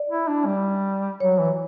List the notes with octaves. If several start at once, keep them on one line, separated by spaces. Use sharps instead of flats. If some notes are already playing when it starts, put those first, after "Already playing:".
Already playing: D5
E4
D4
G3
F#3 C#5
E3